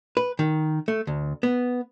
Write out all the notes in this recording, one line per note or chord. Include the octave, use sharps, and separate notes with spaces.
B4
D#3
A3
D2
B3